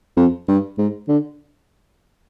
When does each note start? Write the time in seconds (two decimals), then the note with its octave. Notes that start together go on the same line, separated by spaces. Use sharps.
0.17 F2
0.48 G2
0.78 G#2
1.08 D3